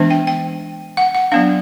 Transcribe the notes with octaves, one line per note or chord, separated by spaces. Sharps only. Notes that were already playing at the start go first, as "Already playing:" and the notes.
Already playing: E3 G#3 B3 D4
G5
G5
F#5
F#5
F#3 B3 D4 F5